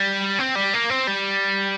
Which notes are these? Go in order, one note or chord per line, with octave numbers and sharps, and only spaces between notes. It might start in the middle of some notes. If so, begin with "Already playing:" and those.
Already playing: G3
C4
G3
A#3
C4
G3